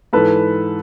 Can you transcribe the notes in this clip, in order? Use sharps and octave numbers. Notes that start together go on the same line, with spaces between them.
G#2 E3 A4 B4